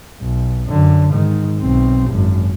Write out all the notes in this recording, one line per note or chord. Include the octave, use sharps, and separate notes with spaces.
B1
F#2 D3
G#2 D#3
B1 C4
G#1 F#2